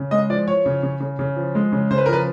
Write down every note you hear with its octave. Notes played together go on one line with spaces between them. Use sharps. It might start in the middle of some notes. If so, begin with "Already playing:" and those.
Already playing: C#3
G#3 D#5
F3 D5
F3 C#5
C#3
C#3
C#3
C#3
F3
G#3
C#3
C#3 C5
B4
A#4
F3 B4